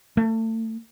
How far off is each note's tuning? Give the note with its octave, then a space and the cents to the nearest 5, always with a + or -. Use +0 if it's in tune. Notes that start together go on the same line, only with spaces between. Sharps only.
A3 +30